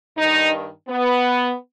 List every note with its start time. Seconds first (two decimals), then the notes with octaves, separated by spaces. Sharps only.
0.18 G2 D#3 D#4
0.89 B3